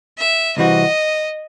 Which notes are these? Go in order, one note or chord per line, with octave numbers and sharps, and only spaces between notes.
E5
C2 C3 E3 C4 F#4 D#5